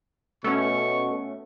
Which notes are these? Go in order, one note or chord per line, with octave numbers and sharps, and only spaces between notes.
B2 A3 B3 C#4 A4 C#6